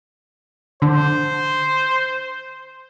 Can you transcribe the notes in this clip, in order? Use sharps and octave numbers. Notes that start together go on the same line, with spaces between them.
D3 C5